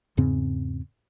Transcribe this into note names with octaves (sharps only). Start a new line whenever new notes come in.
E2 G#2 C#3 C4